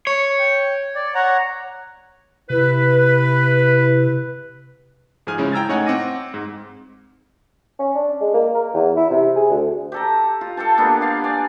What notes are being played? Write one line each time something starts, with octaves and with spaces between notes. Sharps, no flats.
C#5
G5
D5
C#5 F#5 A#5
C3 E4 B4
G#2 F3 G#4 G#5 F6
C#3 F3 G#3 C#4 E4
G5 A#5 E6 G#6 A6
A2 D#4 C#5 D#5 F#5 G#5
C4 F#5 D6 A#6 D#7
G#2
C#4
D4
G#3
A#3
A#4
E2
E4
C3
G#4
D2
G4 A4 A#5
F4
A4 F5 G5 A5
A#3 B3 D4 G4
G4 F5 G5
D5 G#5